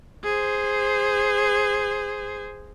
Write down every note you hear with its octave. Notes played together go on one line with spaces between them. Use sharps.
G#4 C5